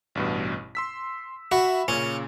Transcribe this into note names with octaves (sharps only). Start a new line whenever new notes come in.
A1 G2 B2
C6 E6 B6
F#4 E5 B5
A#2 C#3 C#4